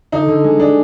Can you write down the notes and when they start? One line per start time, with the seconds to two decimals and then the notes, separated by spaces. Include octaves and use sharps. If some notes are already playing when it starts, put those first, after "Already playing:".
0.12 D3 D#4
0.28 D3
0.44 G#3
0.59 G#3 D4